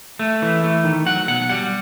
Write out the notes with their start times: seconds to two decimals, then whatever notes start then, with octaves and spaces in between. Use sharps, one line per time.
0.19 A3
0.42 E3
0.64 A3
0.84 D#3
1.06 F#3 F#5
1.28 B2 F#5
1.49 G3 F#5